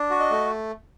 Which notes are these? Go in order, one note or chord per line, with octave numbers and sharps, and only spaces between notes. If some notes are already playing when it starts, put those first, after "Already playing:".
Already playing: D4
F#4
D#5
A3